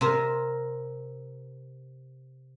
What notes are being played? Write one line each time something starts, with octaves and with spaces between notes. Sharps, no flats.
C3 A#4